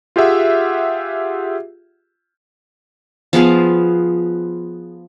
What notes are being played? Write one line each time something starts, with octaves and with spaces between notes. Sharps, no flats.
F4 G4 G#4 E5 F#5
F3 B3 G#4 F5